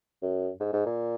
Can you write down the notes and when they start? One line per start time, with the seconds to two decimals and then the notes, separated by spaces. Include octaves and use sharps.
0.22 F#2
0.60 G#2
0.73 G#2
0.86 A#2